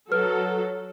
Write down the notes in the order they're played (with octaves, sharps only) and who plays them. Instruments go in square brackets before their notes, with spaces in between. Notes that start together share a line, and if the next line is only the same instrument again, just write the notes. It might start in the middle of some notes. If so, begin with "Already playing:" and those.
[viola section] F#3 A4 [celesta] B4 F6